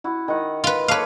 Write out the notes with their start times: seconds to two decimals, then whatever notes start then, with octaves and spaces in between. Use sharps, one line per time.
0.04 E4 F#4
0.28 D#3 F#5
0.64 F4 B4
0.88 A#3 A4 B4 C#5 F5